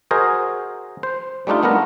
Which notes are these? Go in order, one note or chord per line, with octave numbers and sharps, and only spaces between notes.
F#4 G#4 A#4 C5 D#5
C5
G3 A3 D4 D#4 F4
A3 B3 D4 A#4